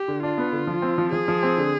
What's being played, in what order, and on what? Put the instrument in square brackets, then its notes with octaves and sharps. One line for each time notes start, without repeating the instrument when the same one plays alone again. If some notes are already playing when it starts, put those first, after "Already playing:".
Already playing: [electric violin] G4
[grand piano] D3
[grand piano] D4 [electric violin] F4
[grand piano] B3
D3
F3
C4
F3
[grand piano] F3 [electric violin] G#4
[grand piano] F3
C4
D3